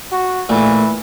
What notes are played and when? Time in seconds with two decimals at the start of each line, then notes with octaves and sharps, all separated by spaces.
0.12 F#4
0.49 A#2 E3 A3